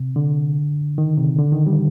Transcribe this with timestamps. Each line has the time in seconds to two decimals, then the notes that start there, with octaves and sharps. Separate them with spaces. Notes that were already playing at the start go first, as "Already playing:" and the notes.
Already playing: C3
0.16 D3
0.98 D#3
1.18 C3
1.38 D3
1.52 D#3
1.67 G3